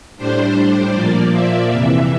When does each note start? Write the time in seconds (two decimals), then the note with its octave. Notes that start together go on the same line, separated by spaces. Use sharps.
0.17 A2 G3 D4 C5
0.55 C5
0.94 A#2 F3 A#3 D5
1.32 E5
1.71 F2 C3 E3